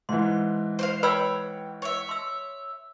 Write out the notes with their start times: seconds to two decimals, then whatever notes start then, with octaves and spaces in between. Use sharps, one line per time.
0.09 G#2 E3 C6
0.79 C5 D5 F5
1.03 B4 C#5 G5 B5 E6
1.82 C#5 E5
2.09 C6 E6